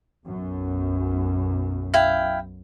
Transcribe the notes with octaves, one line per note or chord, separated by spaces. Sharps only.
B1 F#2
E4 F5 G5